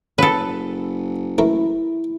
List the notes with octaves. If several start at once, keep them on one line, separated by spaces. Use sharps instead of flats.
F#1 C#3 A4 B4
E3 A3 E4 A#4